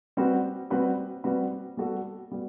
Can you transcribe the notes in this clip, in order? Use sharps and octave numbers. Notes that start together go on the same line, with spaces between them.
G3 C4 F#4 B4
G3 C4 F#4 B4
G3 C4 F#4 B4
G3 B3 F#4 A4
G3 B3 F#4